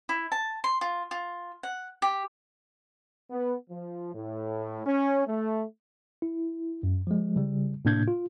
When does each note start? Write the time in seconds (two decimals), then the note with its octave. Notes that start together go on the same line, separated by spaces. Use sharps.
0.09 E4
0.32 A5
0.64 C6
0.81 F4
1.11 F4
1.63 F#5
2.02 G4
3.30 B3
3.70 F3
4.14 A2
4.85 C#4
5.26 A3
6.22 E4
6.83 F#2
7.07 F3 G#3
7.36 C#3 G3
7.85 A2 C3 A#3 D4 G6 G#6
8.08 F4